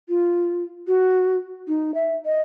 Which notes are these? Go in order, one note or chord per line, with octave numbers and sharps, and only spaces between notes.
F4
F#4
D#4
E5
D#5